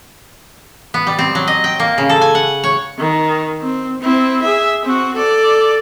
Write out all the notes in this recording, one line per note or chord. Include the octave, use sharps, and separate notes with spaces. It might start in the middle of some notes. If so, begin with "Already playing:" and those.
B3
G3
C4
F#3
D#5
G5
A#3
C#3
A4
G#5
F#5
C#5
D#3
C4
C4 E4
G#4 E5
C4 F#4
A4 D5